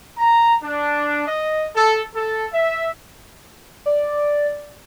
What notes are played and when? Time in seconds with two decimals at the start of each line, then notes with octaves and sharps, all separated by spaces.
0.17 A#5
0.61 D4
1.27 D#5
1.74 A4
2.14 A4
2.52 E5
3.86 D5